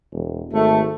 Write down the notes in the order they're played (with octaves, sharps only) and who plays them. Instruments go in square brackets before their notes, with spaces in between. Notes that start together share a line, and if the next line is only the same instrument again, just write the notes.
[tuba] E1
[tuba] G#1 [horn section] A3